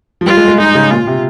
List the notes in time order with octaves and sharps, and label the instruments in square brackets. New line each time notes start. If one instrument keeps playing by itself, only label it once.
[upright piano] F3
[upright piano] G3 [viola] F4
[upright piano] G#3
G#3
[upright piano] G#3 [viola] D#4
[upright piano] C#3
[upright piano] A#2 [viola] F4
[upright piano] C3